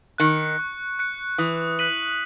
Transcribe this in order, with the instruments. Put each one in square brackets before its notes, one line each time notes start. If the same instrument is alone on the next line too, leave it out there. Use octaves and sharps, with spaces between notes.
[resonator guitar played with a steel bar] D#3 [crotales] F#6 C#7
[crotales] C#6
F#6 C#7
[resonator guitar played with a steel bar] E3 [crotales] D#6
[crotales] F#6 B6 D#7 F#7